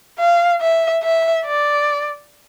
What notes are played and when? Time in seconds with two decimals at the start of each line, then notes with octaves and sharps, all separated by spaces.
0.19 F5
0.61 E5
1.02 E5
1.45 D5